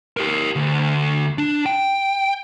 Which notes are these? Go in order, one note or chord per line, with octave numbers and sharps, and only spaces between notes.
G4 A#4
D2
D4
G5